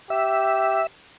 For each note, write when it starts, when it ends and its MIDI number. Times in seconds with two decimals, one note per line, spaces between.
0.10 0.83 67
0.10 0.87 76